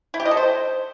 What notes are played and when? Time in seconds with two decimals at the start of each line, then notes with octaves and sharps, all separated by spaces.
0.14 E4
0.20 G4
0.25 D#5
0.31 A4
0.37 C5